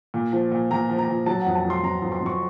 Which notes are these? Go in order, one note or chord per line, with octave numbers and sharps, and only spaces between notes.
A#2
F3
A#2
A#2 A#5
F3
A#5
A#2
F#3 A5
F2 F#5
A5
F2
C6
F2 A#5
F2
C6
F2
C#6